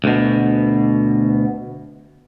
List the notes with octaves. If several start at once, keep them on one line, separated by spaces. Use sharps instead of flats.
D2 B2